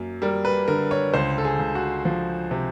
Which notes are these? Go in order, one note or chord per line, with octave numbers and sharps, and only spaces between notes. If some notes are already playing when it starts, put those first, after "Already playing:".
Already playing: F#2 A#3
G3 A#4
B4
D3 A#4
C#5
C#2 C5
A4
G#4
C#2
F#4
F3
C3